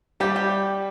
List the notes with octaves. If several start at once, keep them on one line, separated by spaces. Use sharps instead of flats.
G3 G4
G4